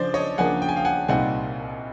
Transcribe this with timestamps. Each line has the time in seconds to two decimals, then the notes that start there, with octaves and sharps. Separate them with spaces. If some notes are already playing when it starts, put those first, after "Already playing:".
Already playing: C#3 F3 D4 C5 D5
0.14 C#5 D#5
0.38 C#3 F3 A#3 D4 F#5 G#5
0.62 G5
0.69 G#5
0.76 F5 G5
0.85 F#5 G#5
1.08 C2 A#2 G3 C4 D#4 F#5 G#5